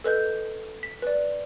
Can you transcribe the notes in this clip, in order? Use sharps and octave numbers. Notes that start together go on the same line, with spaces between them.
A4 B4 D#5 G6
B6
B4 D5